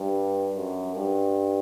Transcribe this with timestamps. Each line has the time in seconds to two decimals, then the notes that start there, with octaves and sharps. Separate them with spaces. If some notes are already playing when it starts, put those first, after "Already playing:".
Already playing: G2
0.56 F#2
0.96 G2